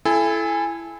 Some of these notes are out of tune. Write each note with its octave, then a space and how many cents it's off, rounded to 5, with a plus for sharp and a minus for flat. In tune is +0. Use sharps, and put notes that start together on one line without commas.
E4 +20 A4 -25 G#5 -20